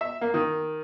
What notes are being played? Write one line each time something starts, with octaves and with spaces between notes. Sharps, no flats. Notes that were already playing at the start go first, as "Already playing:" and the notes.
E5
A#3
D#3